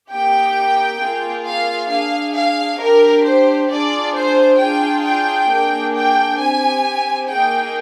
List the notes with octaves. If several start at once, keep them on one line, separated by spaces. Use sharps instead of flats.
A#3 D#4 G4 G5
A#3 F4 G#4
F5
D4 G#4 F5
F5
D4 G4 A#4
C5
D4 F4 G#4 D5
C5
D4 F4 G#4 G5
G5
A#3 D4 G#4
G5
C4 G4 G#5
A#3 D#4 G#4 G5